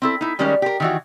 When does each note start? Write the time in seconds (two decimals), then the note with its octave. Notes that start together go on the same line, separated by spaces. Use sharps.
0.02 C4 E4 A4
0.21 D#4 E4
0.39 D#3 G3 G#3 C#4 A#4 D5
0.62 G4 A#4
0.80 D#3 E3 F#4